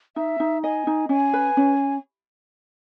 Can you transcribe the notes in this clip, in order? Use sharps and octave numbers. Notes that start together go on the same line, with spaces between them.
D#4 E5
D#4
D#5 G#5
D#4
C#4 G#5
B4
C#4